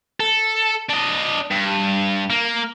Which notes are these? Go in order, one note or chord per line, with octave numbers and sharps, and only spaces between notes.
A4
D4 D#5
G2
A#3